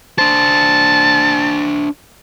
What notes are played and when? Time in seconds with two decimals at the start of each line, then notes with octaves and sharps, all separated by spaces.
0.19 D4 C5 A5